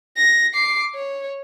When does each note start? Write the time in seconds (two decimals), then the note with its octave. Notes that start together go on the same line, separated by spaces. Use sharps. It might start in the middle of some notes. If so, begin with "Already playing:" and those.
0.17 A#6
0.54 D6 C7
0.95 C#5